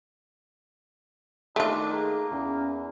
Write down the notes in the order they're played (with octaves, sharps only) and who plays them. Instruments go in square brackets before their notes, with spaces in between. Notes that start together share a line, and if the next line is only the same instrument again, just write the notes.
[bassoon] D#3 [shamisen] A3 F4 [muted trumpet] D4
[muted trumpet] A#3 [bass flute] G#4
[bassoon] E2 [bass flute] C#4